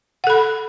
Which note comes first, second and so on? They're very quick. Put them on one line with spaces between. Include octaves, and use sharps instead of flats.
F#5 A4 B5